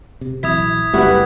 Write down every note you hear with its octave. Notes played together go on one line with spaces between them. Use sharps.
C3
A#1 E3 F#3 E4 D#6 G#6 B6
F#1 D2 C#3 G3 E4 F#4 B4